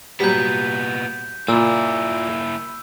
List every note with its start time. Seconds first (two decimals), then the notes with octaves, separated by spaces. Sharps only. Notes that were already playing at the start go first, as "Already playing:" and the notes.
0.20 A#2 F#3 G3 B3 G6 B6
1.48 A#2 A#3 E4 E6